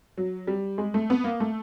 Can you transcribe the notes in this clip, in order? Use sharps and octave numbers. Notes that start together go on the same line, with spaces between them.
F#3
G3
G#3
A3
B3
A#3
A3